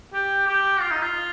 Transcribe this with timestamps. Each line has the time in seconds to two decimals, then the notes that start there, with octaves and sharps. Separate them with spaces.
0.13 G4
0.47 G4
0.80 F4
0.91 D#4
1.02 F4